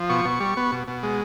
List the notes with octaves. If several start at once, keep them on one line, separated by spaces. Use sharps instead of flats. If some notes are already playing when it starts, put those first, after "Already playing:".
Already playing: F3
B2 C#6
B2
G3
B3
B2
B2
G#3